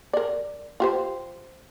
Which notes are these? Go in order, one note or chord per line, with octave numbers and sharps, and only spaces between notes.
A#4 D5
F4 G4 C5